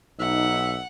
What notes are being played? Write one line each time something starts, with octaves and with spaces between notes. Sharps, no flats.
B1 D#4 E5 F#5